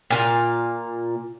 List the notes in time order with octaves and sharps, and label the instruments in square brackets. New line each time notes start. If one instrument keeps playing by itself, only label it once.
[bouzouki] A#2 F5